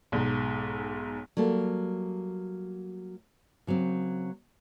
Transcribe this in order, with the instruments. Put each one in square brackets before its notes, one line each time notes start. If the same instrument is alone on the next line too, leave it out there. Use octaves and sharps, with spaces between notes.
[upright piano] B1 G#2
[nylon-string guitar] F#3 G3 A#3 A4
C#3 F#3 A#3 C4